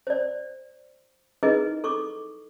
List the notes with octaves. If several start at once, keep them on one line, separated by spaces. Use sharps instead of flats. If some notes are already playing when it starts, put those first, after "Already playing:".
C5 D5
D#4 E4 G#4 A#4 B4 D#5
A4 C#6 D6